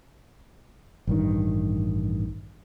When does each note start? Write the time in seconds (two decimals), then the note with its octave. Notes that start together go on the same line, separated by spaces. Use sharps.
1.07 A1 G2 D#3